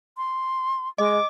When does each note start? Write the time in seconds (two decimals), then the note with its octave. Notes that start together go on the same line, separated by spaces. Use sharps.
0.17 C6
0.98 G#3 D#5 D6